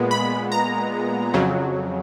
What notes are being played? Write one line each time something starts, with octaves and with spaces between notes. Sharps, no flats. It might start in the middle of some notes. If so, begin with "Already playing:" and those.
Already playing: A#2 G#3 B3
B5
A#5
F2 C#3 F#3